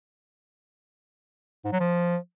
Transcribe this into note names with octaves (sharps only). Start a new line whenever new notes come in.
G#2
F#3
F3